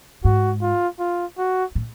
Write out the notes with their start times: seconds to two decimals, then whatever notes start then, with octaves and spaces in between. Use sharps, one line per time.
0.25 G#2 F#4
0.61 F4
0.99 F4
1.38 F#4
1.75 A2